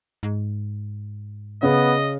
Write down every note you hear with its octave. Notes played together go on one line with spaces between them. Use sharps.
G#2
C#3 B3 D#5